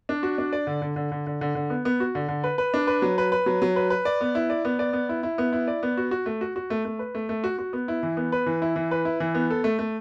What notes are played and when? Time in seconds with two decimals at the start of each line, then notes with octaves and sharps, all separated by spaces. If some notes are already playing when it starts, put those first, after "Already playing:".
0.09 D4
0.23 F#4
0.38 D4
0.53 D5
0.67 D3
0.82 D3
0.96 D3
1.12 D3
1.27 D3
1.41 D3
1.55 D3
1.70 B3
1.85 B3
2.00 F#4
2.15 D3
2.28 D3
2.44 B4
2.58 B4
2.74 D4
2.87 B4
3.02 F#3
3.18 B4
3.32 B4
3.46 F#3
3.62 F#3
3.76 B4
3.90 B4
4.05 D5
4.21 B3
4.35 E4
4.50 D5
4.65 B3
4.79 D5
4.93 B3
5.09 E4
5.23 E4
5.38 B3
5.53 E4
5.68 D5
5.83 B3
5.97 F#4
6.11 F#4
6.26 A3
6.41 F#4
6.56 F#4
6.70 A3
6.85 A3
6.99 B4
7.15 A3
7.29 A3
7.44 F#4
7.59 F#4
7.73 B3
7.88 E4
8.03 E3
8.17 B3
8.32 B4
8.46 E3
8.62 E4
8.76 E3
8.91 B4
9.05 E4
9.20 E3
9.35 B3
9.50 A4
9.64 A3
9.79 A3